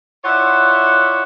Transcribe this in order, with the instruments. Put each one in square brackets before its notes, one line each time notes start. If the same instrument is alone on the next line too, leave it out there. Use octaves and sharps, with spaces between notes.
[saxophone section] E4 F4 C#5 D5 E5 F#5